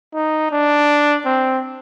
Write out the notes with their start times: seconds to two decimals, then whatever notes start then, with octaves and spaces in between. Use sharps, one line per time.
0.14 D#4
0.51 D4
1.26 C4